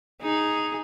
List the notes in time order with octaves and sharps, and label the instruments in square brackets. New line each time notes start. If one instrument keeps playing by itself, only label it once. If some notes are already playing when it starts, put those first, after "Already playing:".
[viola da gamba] D#4 G#4